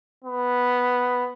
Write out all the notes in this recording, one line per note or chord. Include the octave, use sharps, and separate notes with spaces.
B3